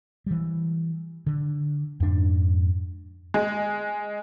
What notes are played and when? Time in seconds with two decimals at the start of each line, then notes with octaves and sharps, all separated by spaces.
0.26 E3 G3
1.27 D3
2.00 F2 G#2 D4
3.34 G#3